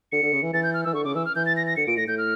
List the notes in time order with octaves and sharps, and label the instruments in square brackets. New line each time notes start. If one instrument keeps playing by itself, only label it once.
[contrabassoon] D3 [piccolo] C#7
[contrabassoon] D3
C#3
E3
[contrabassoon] E3 [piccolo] A6
[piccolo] G6
F6
[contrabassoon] E3 [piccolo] E6
[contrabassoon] D3 [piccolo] C#6
[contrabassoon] C#3 [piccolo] D6
[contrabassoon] E3 [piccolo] E6
[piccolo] F6
[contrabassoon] E3 [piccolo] G6
[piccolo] A6
A#6
A#6
[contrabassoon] D3 [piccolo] C#7
[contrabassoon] A#2 [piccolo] D7
[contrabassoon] A2 [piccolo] A#6
[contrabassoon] A2 [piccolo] G6
[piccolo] F6